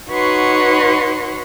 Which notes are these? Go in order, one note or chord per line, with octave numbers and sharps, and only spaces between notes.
D#4 F#4 B4 C#5 F#5 C6